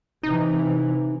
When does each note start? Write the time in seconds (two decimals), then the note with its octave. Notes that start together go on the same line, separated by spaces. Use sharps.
0.23 C3 E3 D#4